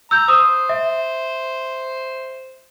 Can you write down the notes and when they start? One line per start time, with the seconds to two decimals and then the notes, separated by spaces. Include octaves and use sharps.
0.11 A#5 E6 G6
0.28 C5 D#6
0.69 E5